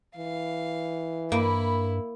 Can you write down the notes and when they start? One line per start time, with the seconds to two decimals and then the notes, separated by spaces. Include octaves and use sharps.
0.17 E3 F5
1.32 G2 A#3 E4 B5